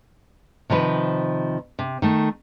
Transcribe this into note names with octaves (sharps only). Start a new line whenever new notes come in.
C3 D#3 F3 B4
C3
D#3 A3